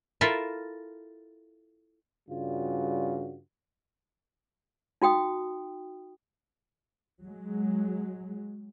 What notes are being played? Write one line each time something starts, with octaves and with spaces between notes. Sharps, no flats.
E4 F4 A4 A#4 E5
G2 C#3 G3 F4 F#4
D#4 F#4 G5 D#6
F#3 G#3